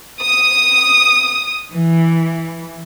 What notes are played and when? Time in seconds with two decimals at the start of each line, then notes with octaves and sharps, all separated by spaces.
0.21 D#6
1.70 E3